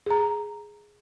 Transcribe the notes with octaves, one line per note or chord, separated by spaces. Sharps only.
G#4 A#5